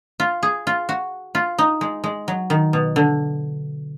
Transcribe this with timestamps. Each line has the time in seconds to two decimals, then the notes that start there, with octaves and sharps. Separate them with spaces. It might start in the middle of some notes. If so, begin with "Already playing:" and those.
0.20 F4
0.43 G#4
0.67 F4
0.89 F#4
1.35 F4
1.58 D#4
1.81 G#3
2.04 G#3
2.28 F#3
2.50 D#3
2.73 B2
2.96 D3